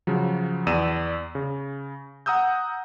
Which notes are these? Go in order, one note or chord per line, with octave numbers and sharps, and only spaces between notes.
C#3 F3 F#3
E2 D5 E6 D#7 E7
C#3
F#5 A#5 D#6 E6 G6